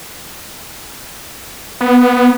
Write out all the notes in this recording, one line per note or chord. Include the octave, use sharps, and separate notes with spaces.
B3